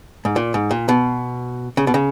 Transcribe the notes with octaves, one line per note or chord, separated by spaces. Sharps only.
G#2
A#2
G#2
A#2
B2
C#3
B2
C#3